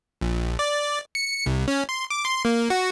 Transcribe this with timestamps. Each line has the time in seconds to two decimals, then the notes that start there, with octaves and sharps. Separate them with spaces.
0.21 A#1
0.59 D5
1.15 C#7
1.46 C2
1.68 C#4
1.89 C6
2.10 D6
2.25 C6
2.45 A#3
2.70 F#4